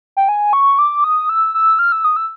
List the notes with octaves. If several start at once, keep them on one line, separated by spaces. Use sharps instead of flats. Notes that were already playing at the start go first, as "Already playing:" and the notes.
G5
G#5
C#6
D6
D#6
E6
E6
F6
E6
D#6
E6